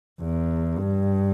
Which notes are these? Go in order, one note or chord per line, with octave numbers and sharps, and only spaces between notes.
E2
G2